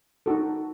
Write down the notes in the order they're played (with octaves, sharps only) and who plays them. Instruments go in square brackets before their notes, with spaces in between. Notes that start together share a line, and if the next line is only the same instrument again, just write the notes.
[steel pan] D#4 F#4 A4